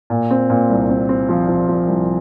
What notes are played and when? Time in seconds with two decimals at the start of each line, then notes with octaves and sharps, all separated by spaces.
0.10 A#2
0.31 C4
0.50 A#2
0.70 C2
0.90 C4
1.09 C4
1.29 F3
1.48 F3
1.68 F3
1.88 C2